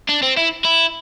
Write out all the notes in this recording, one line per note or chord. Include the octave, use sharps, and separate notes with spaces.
D4
C4
E4
E4